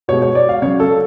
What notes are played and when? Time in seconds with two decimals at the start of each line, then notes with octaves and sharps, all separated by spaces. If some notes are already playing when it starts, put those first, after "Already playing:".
0.08 B2 G#3 C#5
0.22 C#5
0.35 D5
0.49 F5
0.62 C#3 F#3 C#5
0.80 A4